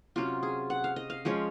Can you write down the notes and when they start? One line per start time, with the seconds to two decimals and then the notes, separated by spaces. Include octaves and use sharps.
0.16 C3 F#3 C#4 F4
0.43 G#4
0.70 F#5
0.84 F5
0.96 D#5
1.10 F5
1.25 F3 G#3 C#4 C#5